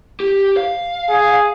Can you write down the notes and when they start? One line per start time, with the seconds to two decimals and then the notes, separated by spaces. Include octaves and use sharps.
0.20 G4
0.57 F5
1.09 G#4